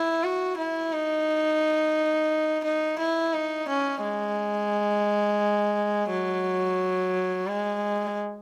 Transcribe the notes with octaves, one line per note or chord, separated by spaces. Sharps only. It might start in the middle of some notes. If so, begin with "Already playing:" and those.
Already playing: E4
F#4
E4
D#4
D#4
E4
D#4
C#4
G#3
F#3
G#3